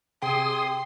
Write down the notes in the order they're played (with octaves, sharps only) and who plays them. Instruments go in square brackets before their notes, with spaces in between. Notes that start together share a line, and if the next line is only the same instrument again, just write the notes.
[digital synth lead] C3 [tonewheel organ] G#4 D#6 [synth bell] G5 [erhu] C6